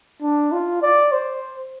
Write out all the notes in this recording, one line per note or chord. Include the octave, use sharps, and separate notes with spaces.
D4
F4
D5
C5